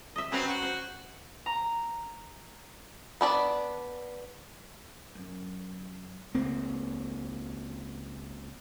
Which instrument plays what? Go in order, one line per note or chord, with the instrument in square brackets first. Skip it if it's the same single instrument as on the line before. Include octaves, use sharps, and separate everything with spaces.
[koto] D#5 E5
[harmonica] F#3 C4 [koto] C#4 B4 A#5
[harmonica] F#4
[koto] C5
[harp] A#5
[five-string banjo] B3 D4 D5
[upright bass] F#2
[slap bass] C#2 A#3 C4